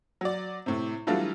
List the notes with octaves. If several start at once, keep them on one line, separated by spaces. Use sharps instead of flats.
F#3 D5
A2 C3
E3 F#3 G3 A3 D4 F4